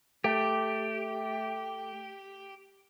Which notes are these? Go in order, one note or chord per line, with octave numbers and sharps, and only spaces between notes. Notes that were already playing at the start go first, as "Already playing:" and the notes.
A3 G4